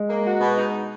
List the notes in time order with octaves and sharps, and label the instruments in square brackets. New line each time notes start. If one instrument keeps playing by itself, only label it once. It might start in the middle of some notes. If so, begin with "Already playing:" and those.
Already playing: [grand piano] G#3
[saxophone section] A#3
F#4
B2
D#4